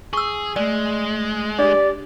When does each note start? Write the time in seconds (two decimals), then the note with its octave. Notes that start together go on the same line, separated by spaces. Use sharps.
0.13 G#4 C#6 E6
0.56 G#3 A3 D5 G#5
1.59 D4 G4 D5